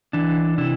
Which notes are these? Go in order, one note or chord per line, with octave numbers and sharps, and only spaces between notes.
E3 D4
C3 E4